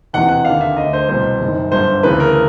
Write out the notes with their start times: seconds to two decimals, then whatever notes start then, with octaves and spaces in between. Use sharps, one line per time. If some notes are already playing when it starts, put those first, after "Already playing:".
0.13 E1 E2 C3 E3 F#5
0.29 F#5
0.45 D#2 D3 F5
0.61 E5
0.77 D2 D3 D#5
0.93 C5
1.08 C2 B2 C5
1.41 F#1 F#2 D#3
1.72 G1 G2 D3 C5
2.03 D2 C#3 E3 B4
2.20 A#4